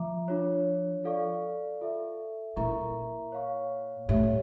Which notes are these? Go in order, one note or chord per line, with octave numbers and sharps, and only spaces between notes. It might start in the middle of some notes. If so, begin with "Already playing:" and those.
Already playing: F3 E5 A#5 D6
D4 F4 C#5
F4 A4 D5 F5 C#6
F4 A4 E5
A#2 E4 A#4 E5 A#5 C#6
C#5 F5 C#6
A2 G4 C#5 E5